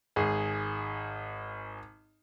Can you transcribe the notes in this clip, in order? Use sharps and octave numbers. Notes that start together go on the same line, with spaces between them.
G#1 G#4